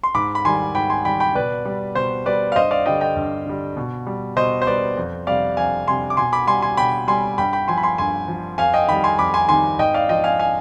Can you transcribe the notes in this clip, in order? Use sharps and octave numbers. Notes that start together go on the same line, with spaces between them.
C6
G#2 B5 D6
B5
D#3 G3 G#5 C6
G#2 G5 B5
G#5 C6
D#3 G3 G5 B5
G5 B5
B2 B4 D5
G3
B2 C5
G3 B4 D5
F5
G2 C5 D#5
D5 F5
D3 G3 D#5 G5
D#5 G5
G2
D3 G3
B2
G3
B2 C5 D#5
C5
G3 B4 D5
F2
C3 G3 D5 F5
F2 F5 G#5
C3 G3 G#5 C6
D6
B2 G#5 C6
B5 D6
G3 G#5 C6
G#5 C6
B2 G5 B5
G3 G#5 C6
G2 G5 B5
G5 B5
F3 G#5 C6
B5
G#5 C6
G2 G#5 C6
F3
F2 F5 G#5
D#5 G5
D#3 G3 G5 B5
G#5 C6
F2 B5 D6
G#5 C6
D#3 G3 G#5 C6
G#2 D#5 G5
D5 F5
F3 D#5 G5
F5 G#5
F5 G#5